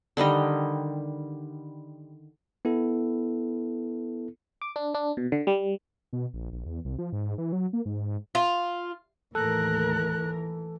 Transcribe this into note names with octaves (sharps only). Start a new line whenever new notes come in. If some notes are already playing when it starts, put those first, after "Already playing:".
D3 D#3 G3 D#5
B3 E4 A4
D6
D4
D4
B2
D3
G3
B2
A#1
A#1
E2
C2
F3
G#2
E3
F#3
A#3
G#2
F4
D#2 A2 E3 A4 A#4 F#6